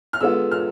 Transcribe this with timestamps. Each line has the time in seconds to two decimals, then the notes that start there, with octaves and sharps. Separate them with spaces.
0.13 F6
0.20 D3 G#3 B3 F4 E6
0.51 F6